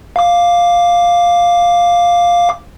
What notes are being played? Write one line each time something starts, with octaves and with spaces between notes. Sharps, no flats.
F5 D6